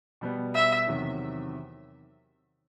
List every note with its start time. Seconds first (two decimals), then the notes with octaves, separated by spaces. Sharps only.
0.21 B2 G3 B3
0.55 E5
0.87 E2 C3 D#3 F#3